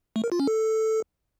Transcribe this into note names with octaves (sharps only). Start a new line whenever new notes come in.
A3
A#4
F4
C#4
A4